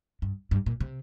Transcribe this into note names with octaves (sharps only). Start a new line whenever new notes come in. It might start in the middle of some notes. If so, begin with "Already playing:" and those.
G2
G2
A#2
C3